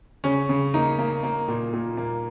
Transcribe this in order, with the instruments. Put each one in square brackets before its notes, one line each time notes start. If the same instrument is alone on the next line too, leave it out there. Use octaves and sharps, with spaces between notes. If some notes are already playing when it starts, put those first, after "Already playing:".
[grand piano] C#3 C#4
C#3
A#3 D#4
A#3
A#3
A#2
A#2
A#3